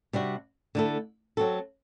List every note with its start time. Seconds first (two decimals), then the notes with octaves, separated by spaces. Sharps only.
0.13 C3 G3 D4 F#4
0.75 D3 A3 E4 A4
1.37 F#3 C4 F#4 A4